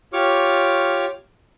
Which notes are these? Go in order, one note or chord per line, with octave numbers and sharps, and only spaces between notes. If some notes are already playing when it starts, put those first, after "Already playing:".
F4 G4 C#5 C#6 D6 F6